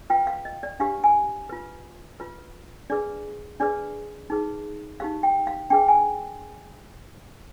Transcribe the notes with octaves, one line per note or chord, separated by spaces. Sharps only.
F4 B4 G5
F5
D#5
D5
D4 G4 B4 F5
G#5
F4 B4
F4 B4
D4 G#4 B4 D5
D4 G#4 B4 D5
D#4 G#4 B4
D#4 G4 C5 F5
G5
F5
D4 G#4 B4 G5
G#5